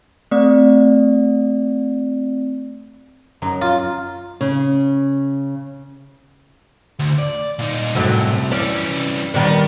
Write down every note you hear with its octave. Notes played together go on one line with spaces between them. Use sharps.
A3 C4 D5
F#2 F#3 D#4
F4
C#3
D2
D5
A#2 D#4
C2 F#2 A2 F#3
E3 G3 C#4 D5
D#3 G3 B3 D4